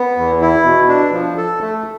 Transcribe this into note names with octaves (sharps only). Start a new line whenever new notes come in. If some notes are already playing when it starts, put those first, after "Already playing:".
Already playing: B3
E2
E4
B2
D4
F3
A4
A3